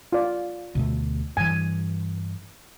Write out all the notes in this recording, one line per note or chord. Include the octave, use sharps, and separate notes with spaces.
F4 D5
D2 B2 A3
G2 E3 G#5